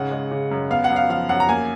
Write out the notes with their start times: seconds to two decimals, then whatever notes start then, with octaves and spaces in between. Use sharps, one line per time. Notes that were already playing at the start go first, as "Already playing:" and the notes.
Already playing: G#2 C#3 F#5
0.11 G#3
0.31 C#3
0.51 F#2
0.70 B3 F5
0.84 F#5
0.90 F#2
0.96 F5
1.09 F3 F5
1.29 F#2 F#5
1.40 A#5
1.48 A#3 G#5